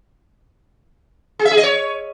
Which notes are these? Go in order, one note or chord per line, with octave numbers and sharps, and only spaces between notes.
G#4
E5
G#4
D#5
C#5